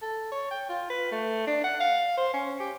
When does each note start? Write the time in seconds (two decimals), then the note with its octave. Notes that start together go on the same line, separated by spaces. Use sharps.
0.02 A4
0.32 C#5
0.51 G5
0.69 F4
0.90 B4
1.12 A3
1.47 D4
1.64 F#5
1.80 F5
2.17 C5
2.34 C#4
2.60 G4